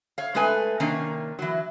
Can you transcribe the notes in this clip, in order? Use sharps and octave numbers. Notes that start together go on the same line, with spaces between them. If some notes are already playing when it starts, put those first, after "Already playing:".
C#5 F5
G#3 A3 C4 B4 G#5
C3 D#3 A#3 C#4 D4
E3 F#3